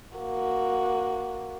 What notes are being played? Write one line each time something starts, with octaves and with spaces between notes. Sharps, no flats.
A#3 F#4